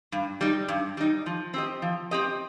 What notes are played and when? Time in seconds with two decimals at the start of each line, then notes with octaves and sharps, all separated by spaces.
0.12 G2
0.41 G3 D#4
0.68 G2
0.97 G3 D#4
1.26 F3
1.54 C4 G4 D#5
1.82 F3
2.11 C4 G4 D#5